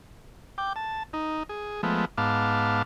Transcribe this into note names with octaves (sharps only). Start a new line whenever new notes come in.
G5 D6
A5
D#4
G#4
F3 G#3 A3 B3
G#2 B3 F5 A5 D6